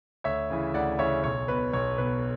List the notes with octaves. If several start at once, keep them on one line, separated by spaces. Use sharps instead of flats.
D2 C#5 E5
C#3 E3
D2 D5 F#5
C#3 E3 C#5 E5
B1 C#5
B2 B4
B1 C#5
B2 B4